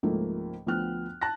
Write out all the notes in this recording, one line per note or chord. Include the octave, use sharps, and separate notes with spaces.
C#2 G#2 F3 A3 A#3
D2 F3 B3 G5 F6 F#6
A5 F#6 A#6